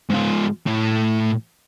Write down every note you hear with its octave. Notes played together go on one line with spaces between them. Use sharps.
G#2 F4
A2